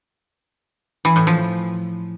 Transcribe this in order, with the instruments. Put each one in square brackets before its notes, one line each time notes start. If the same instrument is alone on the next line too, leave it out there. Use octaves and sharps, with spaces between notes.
[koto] E3
A2
F3